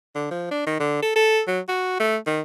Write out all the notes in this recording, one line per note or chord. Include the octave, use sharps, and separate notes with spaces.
D3
F3
D4
D#3
D3
A4
A4
F#3
F#4
A3
D#3